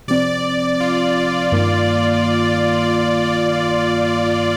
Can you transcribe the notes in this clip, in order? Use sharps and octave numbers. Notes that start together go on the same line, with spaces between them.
C3 F3 C4 D5
F4
G2 D#3 A#3